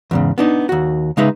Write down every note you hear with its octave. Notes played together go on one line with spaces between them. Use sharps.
E2 G#2 C#3
B3 D4 D#4
D#2 F#4
C#3 G#3 D#4 B4 E5